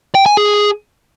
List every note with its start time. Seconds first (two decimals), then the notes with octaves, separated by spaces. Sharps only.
0.15 G5
0.26 G#5
0.37 G#4